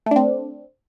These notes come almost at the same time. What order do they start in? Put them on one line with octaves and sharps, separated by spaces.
A3 D4 C4